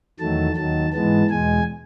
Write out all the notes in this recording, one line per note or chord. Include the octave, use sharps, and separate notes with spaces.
E2 D#3 F#3 A3 A5
D#2 D#3 F#3 A5
G#2 E3 G#3 B3 A5
E2 B2 G#3 G#5